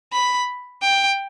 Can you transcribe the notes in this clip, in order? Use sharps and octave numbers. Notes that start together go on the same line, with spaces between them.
B5
G5